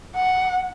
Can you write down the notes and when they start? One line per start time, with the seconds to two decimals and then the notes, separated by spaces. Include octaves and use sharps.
0.15 F#5